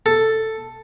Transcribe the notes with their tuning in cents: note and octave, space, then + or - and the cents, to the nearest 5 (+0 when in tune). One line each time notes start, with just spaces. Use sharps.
A4 +5